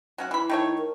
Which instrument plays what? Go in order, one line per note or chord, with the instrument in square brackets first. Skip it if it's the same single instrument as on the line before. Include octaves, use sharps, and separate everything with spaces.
[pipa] F#3 C#4 F#5
[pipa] E3 B5 [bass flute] E4
[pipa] D#3 A3 C#5
[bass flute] A#4